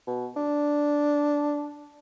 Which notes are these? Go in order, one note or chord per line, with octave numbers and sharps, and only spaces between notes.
B2
D4